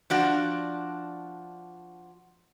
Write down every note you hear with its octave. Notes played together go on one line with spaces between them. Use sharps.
F3 D4 F#4